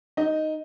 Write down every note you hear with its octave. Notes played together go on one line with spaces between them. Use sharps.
D#4 D#5